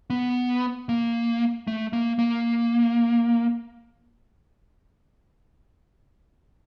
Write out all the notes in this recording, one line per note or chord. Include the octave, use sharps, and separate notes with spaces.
B3
A#3
A3
A#3
A#3